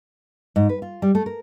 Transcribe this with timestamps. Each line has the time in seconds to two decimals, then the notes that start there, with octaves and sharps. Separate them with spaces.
0.56 G#2
0.69 B4
0.82 F4
1.02 G3
1.15 A3
1.26 A#4